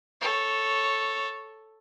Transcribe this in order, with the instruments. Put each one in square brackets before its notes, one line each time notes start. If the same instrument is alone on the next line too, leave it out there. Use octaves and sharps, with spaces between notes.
[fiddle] A4 C#5